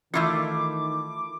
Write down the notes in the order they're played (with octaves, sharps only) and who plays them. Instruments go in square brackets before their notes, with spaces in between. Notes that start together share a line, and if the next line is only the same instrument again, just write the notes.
[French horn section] D#3 [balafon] E3 E5 C#6 [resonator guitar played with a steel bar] A3 E4 F4 [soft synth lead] D6